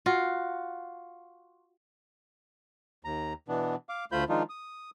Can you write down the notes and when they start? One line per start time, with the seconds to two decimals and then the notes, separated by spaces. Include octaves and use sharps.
0.06 F4 F#4
3.05 D#2 A#5
3.48 B2 E3 B3 D4
3.89 F5 D6
4.12 D2 A3 F4 C5 B5 G6
4.29 D#3 F3 G#3 D4 D#4 F4
4.49 D#6